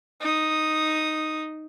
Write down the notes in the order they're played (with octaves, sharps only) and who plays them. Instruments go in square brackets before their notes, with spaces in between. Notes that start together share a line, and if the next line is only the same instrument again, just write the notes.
[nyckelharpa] D#4 D#6